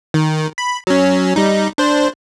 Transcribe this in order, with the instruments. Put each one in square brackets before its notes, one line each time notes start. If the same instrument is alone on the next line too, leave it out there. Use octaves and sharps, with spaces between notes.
[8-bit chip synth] D#3
B5
F#3 C#4
G3 D#4
D4 C5